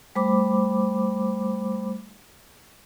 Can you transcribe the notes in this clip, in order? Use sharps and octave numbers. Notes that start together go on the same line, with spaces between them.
G3 A3 C5 B5 D6